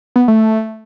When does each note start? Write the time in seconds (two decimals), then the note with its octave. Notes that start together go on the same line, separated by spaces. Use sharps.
0.16 B3
0.28 A3